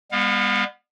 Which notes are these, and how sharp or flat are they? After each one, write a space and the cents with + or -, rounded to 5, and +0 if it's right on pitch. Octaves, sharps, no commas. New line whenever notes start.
G3 +45 B3 -15 F5 +25